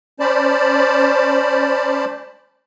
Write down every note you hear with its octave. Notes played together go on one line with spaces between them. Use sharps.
C#4 C5 D5 A5 B5